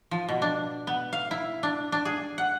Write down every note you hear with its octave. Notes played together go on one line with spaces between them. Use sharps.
F3
B2
D4
B3
F5
E4
D4
D4
G#4
F#5